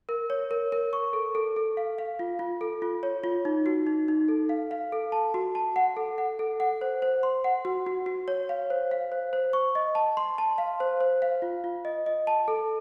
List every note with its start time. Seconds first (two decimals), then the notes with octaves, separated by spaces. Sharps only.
0.09 A#4
0.30 C#5
0.51 A#4
0.72 A#4
0.93 C#6
1.13 A4
1.35 A4
1.56 A4
1.77 F5
1.98 F5
2.19 F4
2.39 F4
2.61 A4
2.82 F4
3.03 C#5
3.24 F4
3.45 D#4
3.66 F#4
3.87 D#4
4.08 D#4
4.28 A4
4.49 F5
4.71 F5
4.92 A4
5.12 A5
5.34 F#4
5.55 A5
5.76 F#5
5.97 A4
6.18 F#5
6.39 A4
6.60 F#5
6.81 C5
7.02 C5
7.23 C6
7.44 F#5
7.65 F#4
7.86 F#4
8.06 F#4
8.28 C#5
8.49 F5
8.70 C5
8.91 F5
9.12 C5
9.33 C5
9.53 C#6
9.75 D#5
9.95 A5
10.17 C6
10.38 A5
10.58 F5
10.80 C5
11.01 C5
11.22 F5
11.42 F4
11.64 F4
11.85 D#5
12.06 D#5
12.27 A5
12.48 A4